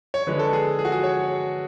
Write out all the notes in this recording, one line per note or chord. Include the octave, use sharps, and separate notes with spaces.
C#5
D3 G#3 B4
A4
G#4
G#4
F#4
G#4
C#5